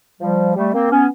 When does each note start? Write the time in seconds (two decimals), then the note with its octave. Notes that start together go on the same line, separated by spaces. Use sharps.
0.21 F3 G3
0.56 G3 A3
0.73 A#3 C4
0.91 B3 C#4